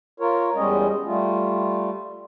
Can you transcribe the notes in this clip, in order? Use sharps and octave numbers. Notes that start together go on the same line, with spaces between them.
F4 A#4 C#5
E2 G3 G#3 C#4 D#5
G3 A3 F4